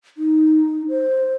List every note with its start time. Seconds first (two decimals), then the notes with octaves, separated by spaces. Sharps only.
0.18 D#4
0.89 C5